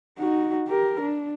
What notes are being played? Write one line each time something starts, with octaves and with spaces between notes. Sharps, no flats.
D#4 F#4
G4 A#4
D4